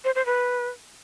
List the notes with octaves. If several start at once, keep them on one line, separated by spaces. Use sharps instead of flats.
C5
C5
B4